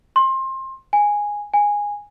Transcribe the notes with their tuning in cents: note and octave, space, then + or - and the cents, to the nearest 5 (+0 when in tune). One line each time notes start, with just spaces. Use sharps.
C6 +25
G#5 -5
G#5 -10